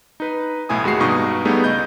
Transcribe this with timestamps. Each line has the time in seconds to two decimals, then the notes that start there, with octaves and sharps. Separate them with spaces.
0.20 D#4 B4
0.69 B1 A2 E4 G#5 D#6
0.84 D#2 G#3 F#4 C7
1.00 G2 B2 D#4 C#6 D#6
1.45 G3 A3 B3 D#4 G#4
1.64 C#2 D#5 G6